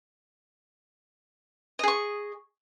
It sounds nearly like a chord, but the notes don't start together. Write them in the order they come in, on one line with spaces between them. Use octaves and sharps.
D#5 G#4 C#6